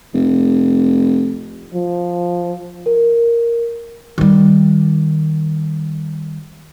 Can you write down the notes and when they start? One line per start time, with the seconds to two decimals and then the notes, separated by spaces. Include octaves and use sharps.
0.14 F1
1.74 F3
2.86 A#4
4.18 D#3 G3